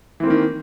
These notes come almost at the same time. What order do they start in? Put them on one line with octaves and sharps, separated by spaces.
E3 C4 A#3 D#3